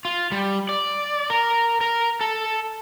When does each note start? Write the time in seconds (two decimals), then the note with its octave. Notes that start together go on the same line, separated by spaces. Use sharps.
0.05 F4
0.32 G3
0.69 D5
1.30 A#4
1.81 A#4
2.21 A4